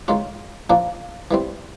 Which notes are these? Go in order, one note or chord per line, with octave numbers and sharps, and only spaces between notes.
D#3 G#3 C#4 F4
A#2 F3 A#3 D4
E3 G3 C4